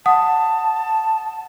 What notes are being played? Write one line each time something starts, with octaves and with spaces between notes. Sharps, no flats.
F#5 A5 D#6